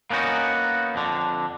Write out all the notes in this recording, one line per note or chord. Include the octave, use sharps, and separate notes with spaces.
A#3 B3 C#4 D#4 F#4
F2 D3